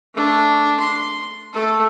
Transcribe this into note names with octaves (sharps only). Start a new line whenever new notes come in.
A3 D4
C6
A3 A4